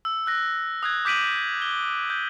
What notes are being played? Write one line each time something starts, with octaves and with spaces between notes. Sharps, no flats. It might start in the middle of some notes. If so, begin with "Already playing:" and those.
E6
E6 F#6 A#6
D#6 F#6 G#6
D6 G6 B6 D7 D#7 F#7
G7
G6